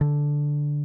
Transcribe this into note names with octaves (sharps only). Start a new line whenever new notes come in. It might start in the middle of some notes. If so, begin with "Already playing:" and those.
D3